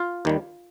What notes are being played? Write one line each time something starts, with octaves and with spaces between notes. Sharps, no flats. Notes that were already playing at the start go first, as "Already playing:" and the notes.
Already playing: F4 F5
D#2 D#3 G3